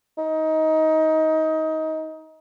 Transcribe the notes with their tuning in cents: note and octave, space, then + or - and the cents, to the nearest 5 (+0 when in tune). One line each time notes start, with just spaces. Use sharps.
D#4 +20